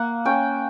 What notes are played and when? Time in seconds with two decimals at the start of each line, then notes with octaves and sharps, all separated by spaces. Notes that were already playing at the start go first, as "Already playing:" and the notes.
Already playing: A#3 F#5
0.25 C#4 G5